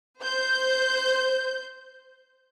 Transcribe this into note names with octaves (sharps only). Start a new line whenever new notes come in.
C5 G6